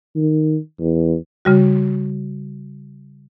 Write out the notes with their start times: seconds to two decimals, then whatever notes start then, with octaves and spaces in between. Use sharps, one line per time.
0.16 D#3
0.80 E2
1.45 C#3 G3 F#4